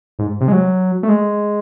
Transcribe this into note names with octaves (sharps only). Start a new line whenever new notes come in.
G#2
C3
G#3
F#3
A3
G#3